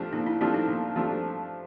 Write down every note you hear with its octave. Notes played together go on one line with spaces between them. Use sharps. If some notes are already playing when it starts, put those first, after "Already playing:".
Already playing: F3 A3 D4 G4
A#2 D#4
E4
F3 A3 D4 E4 G4
D#4
A#2
F3 A3 D4 G4